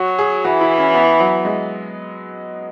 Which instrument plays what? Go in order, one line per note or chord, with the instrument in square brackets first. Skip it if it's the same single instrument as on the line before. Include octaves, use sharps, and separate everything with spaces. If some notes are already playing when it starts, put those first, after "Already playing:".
Already playing: [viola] F#3 [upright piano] F#4
[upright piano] G#4
[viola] E3 [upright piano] F#4
[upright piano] E4
C#4
B3
F#3
G#3